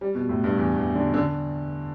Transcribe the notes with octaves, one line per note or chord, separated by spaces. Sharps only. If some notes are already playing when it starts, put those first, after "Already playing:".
G3
B2
A2
G2
E2
E2
D3
D3